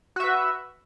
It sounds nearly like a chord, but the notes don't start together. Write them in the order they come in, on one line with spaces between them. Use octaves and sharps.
F#4 E5 B4